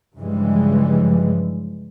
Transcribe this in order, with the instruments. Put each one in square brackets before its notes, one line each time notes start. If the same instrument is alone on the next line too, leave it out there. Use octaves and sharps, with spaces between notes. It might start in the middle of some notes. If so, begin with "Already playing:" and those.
[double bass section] G2 C#3 E3 F3 G3 G#3